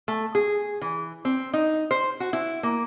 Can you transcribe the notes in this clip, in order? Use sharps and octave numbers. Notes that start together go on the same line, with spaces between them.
A3
G#4
E3
C4
D#4
C5
F#4
E4
A#3